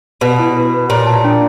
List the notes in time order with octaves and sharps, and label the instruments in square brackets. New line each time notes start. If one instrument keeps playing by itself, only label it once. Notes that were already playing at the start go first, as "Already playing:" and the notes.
[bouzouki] B2 [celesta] B4
[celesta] E4
B4
B4
[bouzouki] A#2 [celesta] C#5
[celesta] A5
D4